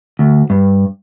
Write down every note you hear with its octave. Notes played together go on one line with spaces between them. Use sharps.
D2
G2